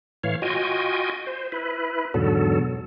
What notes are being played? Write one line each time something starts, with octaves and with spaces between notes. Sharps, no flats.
A2 E3 C#5 F5
F4 F#4 D#5 G5 G#5
C5
E4 B4
E2 G#2 B2 D3 F#3 A4